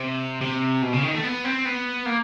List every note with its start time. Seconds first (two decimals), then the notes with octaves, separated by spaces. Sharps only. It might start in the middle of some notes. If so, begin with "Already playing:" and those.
Already playing: C3
0.42 C3
0.82 B2
0.93 C#3
1.03 D#3
1.13 A3
1.23 B3
1.44 C4
1.65 B3
2.05 A#3